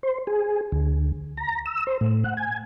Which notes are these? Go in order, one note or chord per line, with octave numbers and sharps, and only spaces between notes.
C5
G#4
D2
A#5
E6
C5
A2
F#5
G#5